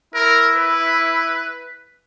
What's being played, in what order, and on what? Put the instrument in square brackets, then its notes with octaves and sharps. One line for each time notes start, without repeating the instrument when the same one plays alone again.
[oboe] E4 [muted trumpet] A#4
[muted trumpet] B4